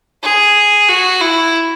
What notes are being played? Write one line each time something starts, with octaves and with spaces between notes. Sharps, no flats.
G#4
F#4
E4